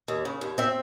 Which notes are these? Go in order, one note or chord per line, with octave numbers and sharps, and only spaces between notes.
D#2
C#3
D#2
C4 E5